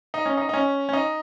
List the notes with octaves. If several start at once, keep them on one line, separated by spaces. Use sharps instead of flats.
D#4
C#4
D#4
D#4
C#4
C#4
D#4